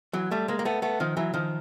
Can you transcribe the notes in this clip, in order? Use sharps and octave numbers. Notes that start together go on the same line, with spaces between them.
E3 F#3
G3 A3
G#3 A#3
A#3
A3 B3
A3 B3
D#3 F3
E3 F#3
D#3 F3